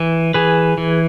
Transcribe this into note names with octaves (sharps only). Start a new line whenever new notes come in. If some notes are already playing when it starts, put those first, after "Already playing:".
Already playing: E3
E3 G#4 B4
E3